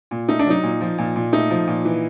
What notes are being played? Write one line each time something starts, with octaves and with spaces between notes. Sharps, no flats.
A#2
A3 D#4
D4
F#3 D#4
A#2
F3
A#2
A#2
A3 D#4
F3
A#2
E3